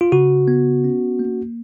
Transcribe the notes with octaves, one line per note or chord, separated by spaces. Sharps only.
F4
C#3 F#4
B3
C#4
A#3